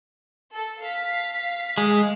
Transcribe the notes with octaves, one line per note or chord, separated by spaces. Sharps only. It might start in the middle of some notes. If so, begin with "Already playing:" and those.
A4
F5 B6
G#3